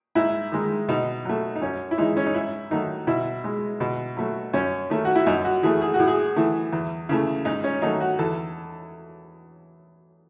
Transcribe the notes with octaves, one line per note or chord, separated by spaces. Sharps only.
G#2 E4
D#3 G#3
B2 D#4
F#3 A3
D#4
F#2 C#4
E4
E3 G#3 D#4
C#4
D#4
G#2 E4
D#3 F#3 A3 D#4
B2 E4
G#3
B2
F#3 A3
F#2 C#4
D#3 A3
F#4
E4
F#2 D#4
F#4
E3 A3 G#4
G#4
F#4
A2
G#4
E3 A3
E2
C#3 E3 A3
G#2 D#4
C#4
D#3 F#3 A3 D#4
F#4
E2 A4